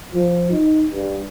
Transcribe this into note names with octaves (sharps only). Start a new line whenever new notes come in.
F3
D#4
G2